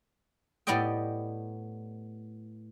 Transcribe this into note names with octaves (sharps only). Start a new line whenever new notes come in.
A2 B3 G4 D5 D#5 G5